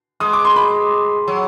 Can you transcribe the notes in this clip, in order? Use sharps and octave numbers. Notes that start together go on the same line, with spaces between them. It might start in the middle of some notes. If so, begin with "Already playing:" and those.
G#3 D#6
D6
C6
B5
F#3